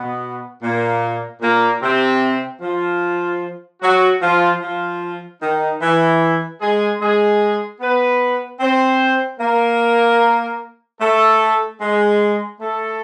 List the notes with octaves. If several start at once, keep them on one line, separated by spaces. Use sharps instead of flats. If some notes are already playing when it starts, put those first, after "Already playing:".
Already playing: B2 B3
A#2 A#3
A#2 A#3
C3 C4
F3 F4
F#3 F#4
F3 F4
F3 F4
D#3 D#4
E3 E4
G#3 G#4
G#3 G#4
B3 B4
C4 C5
A#3 A#4
A3 A4
G#3 G#4
A3 A4